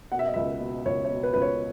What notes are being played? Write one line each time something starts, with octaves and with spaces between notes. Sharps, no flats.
B2 F#5
E5
D#5
C#2 E5
B2
C#2 C#5
C#5
B2
B4
C#2 B4
C#5